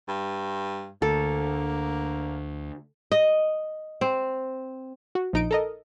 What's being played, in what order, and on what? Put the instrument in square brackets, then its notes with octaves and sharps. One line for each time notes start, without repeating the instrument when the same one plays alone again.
[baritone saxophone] G2
[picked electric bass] D2 [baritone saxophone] A#3 [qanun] A4
[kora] D#5
C4
[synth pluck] F#4
A#1 D#4 D7
A4 A#4 D#5